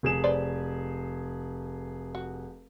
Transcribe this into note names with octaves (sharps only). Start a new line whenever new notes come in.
F1 G#4 E7
B4 C5 D5
F#4